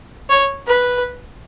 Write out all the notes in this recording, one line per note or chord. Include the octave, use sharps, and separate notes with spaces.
C#5
B4